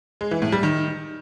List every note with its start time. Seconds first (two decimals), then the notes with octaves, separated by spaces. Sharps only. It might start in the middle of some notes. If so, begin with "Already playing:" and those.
0.21 G#3
0.31 E3
0.42 A2
0.52 G3
0.63 D#3